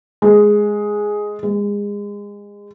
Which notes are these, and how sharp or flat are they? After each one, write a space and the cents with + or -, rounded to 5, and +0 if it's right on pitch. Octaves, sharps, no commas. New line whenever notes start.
G#3 +5
G#3 -25